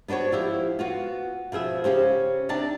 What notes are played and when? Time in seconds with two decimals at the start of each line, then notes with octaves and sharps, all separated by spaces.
0.08 B3 D4 F#4 C5 C#5
0.32 F3 E4 G4
0.79 B3 F4 F#4
1.52 B2 F3 G#4 E5
1.84 C#3 C#4 G4 C5
2.49 C3 D4 D#4 G4 A5